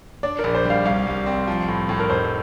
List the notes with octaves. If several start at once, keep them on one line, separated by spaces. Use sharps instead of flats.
D4 D5
A#4
A#1
C5
G3 F5
C2 F5
C2
C4
F3
A2
A2
A#4
F1 C5